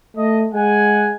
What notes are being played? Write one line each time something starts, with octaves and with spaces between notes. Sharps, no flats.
A3 D#5
G#3 F#5 G#5